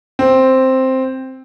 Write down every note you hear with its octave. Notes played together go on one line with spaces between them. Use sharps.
C4